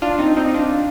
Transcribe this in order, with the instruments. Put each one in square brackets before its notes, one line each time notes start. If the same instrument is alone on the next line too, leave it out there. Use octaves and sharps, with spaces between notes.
[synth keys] D4 F4
C4 D#4
C4 D#4
D#4
D4 F4